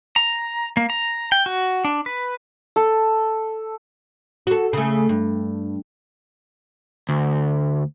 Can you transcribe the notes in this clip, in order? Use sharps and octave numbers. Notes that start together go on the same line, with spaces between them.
A#5
A#3
A#5
G5
F#4
D4
B4
A4
F#4 A4
C#3 A3
G2
D2